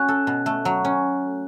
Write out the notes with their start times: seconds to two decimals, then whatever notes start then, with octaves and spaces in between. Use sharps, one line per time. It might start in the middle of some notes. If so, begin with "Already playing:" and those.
Already playing: C#4 F#4 F#6
0.08 A4
0.27 B2
0.46 A3
0.65 F#3
0.85 C#4